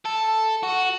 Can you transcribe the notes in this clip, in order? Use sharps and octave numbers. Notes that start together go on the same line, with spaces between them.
A4
F#4